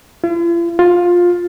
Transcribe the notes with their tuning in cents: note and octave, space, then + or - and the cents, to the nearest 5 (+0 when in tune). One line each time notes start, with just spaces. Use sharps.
F4 -45
F4 +15